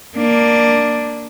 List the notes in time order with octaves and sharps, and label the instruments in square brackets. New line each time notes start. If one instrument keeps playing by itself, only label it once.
[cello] A#3 D4